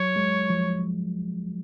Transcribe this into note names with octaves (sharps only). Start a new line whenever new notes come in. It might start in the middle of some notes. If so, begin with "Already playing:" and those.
Already playing: F#3 C#5
G#3
F3